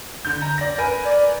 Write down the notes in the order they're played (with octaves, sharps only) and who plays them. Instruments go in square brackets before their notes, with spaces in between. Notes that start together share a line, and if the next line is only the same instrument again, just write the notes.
[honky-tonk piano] D3 G6
A#5
D5 A#6
A#4 B4 G#5
[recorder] D5